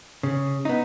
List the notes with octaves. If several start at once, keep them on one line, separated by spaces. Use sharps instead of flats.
C#3
B3 D#4